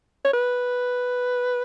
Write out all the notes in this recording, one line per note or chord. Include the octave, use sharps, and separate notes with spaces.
C#5
B4